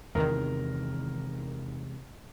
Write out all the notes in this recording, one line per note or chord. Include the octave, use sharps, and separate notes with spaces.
E2 C3 D#3 E3 G#3 A#4